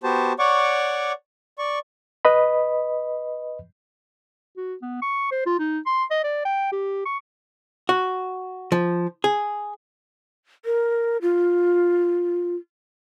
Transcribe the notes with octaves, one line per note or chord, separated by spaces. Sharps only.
B3 F#4 G4 C5 A5
C#5 D5 F#5 C#6 D6
D5 C#6
B4 D#5 B5
F#4
B3
C#6
C5
F4
D#4
C6
D#5
D5
G5
G4
C#6
F#4
F3
G#4
A#4
F4